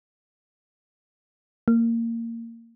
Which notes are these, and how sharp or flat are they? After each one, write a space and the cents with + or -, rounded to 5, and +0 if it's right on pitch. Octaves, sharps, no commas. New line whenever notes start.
A#3 -20